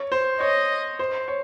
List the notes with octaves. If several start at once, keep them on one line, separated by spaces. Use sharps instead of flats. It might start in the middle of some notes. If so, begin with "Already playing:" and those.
Already playing: C#5
C5
C#5 D#5
C5
C#5